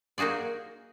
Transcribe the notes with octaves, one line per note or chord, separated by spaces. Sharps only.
A#3 D#4 F#4 G#4 D5